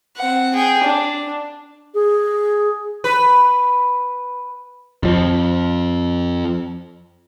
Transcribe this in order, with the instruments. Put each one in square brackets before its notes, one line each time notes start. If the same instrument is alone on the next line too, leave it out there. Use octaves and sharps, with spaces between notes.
[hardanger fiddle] C4 F#5
G#4 G5
D4
[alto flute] G#4
[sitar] B4
[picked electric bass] F2 F3